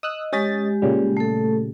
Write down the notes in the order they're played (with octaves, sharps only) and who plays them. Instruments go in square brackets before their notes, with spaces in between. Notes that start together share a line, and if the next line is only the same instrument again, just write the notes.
[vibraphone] D#5 [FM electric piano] D#6 E6 F#6
[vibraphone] G#3 G4 [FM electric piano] C#4 D#5 A6
[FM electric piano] A#2 C#3 G3
[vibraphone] A3 A4